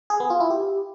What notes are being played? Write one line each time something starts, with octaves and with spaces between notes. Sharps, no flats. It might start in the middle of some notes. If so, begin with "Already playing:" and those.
G#4
B3
F4
E4
G4